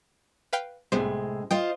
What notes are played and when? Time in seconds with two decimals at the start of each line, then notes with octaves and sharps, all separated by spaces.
0.53 B4 F5 G5
0.92 C2 A2 C3 G#3 B3 C5
1.51 F4 C5 D#5 G5